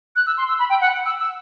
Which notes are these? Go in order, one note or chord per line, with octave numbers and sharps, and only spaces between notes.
F#6
E6
C6
E6
B5
G5
F#5
E6
E6